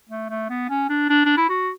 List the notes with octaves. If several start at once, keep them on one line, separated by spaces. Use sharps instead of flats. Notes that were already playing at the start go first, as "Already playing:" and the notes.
A3
A3
B3
C#4
D4
D4
D4
E4
F#4